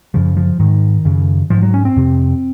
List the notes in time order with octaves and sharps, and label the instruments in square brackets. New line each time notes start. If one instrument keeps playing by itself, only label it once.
[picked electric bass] F#2 C#3 F3
F3
G#2 D#3
F#2 C#3
G#2 F3
F#3
C#4
C4
F2 C3